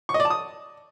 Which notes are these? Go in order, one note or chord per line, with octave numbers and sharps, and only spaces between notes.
C#6
D#5
D5
A5
D#6